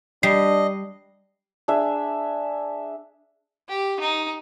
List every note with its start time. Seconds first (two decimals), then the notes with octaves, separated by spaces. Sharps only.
0.23 G3 D4 D#5 C7
1.68 D4 G#4 E5
3.69 G4
3.99 D#4